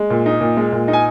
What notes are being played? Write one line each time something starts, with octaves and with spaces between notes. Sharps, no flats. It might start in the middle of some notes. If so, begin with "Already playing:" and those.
Already playing: G#3
A#2
D#4
A#2
G#3
A#2
D#4
G#5